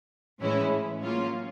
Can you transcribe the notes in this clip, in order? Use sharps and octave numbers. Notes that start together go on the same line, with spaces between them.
A2 E3 G#3 C#4 E4
F#3 A#3 C#4 F4